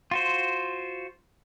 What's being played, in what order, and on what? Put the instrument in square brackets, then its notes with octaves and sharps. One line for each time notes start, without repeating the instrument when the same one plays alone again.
[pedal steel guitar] F4 F#4 C5